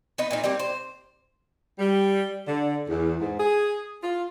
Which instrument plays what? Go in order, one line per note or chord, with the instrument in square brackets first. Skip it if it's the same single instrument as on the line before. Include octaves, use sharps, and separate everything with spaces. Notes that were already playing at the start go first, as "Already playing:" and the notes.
[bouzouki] B3 D#4 B4
A#2 D4 D#4
G3 A#3 C4 G4
C5
[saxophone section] G3
D3
E2
G#2
G#4
F4